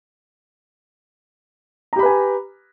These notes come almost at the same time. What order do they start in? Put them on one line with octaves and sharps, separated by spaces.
A#5 G4 B5 B4 G#5